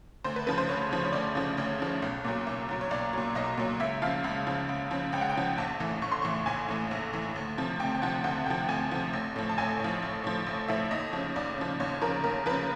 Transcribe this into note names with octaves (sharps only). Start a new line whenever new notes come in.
D2 C5
B4
C#3 F3 B4
C5
D2 C#5
C#3 F3
C#5
D2 D5
C#3 F3
D2 C#5
C#3 F3
B1
A#2 F#3
B1
A#2 F#3
C#5
B1 D5
A#2 F#3
B1 D#5
A#2 F#3
C#2 E5
C#3 F3 F5
C#2
C#3 F3
C#2
C#3 F3
C#2 G5
F#5
G5
C#3 F3
A#1 A5
A2 E3
A#1 C#6
C6
A2 E3 C#6
A#1 G#5
A2 E3
A#1
A2 E3
D2
C3 F3
D2 G5
G5
C3 F3 F#5
D2 F#5
C3 F3 G5
D2 G#5
C3 F3
A1
A2 F3
A5
A1 G#5
A2 F3
A1
A2 F3
A1
A2 F3 E5
D#2 D#5
C#3 F3
D#2 D5
C#3 F3
D#2 C#5
C#3 F3 A#4
D#2 A#4
C#3 F3 B4